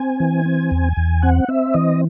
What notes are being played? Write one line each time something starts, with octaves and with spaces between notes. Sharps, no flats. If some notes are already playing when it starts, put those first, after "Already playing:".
Already playing: C4 G#5
E3
C4
E2
E2
C4 F#5
C4 E5
E3 D#5